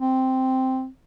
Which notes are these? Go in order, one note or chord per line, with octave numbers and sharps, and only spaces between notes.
C4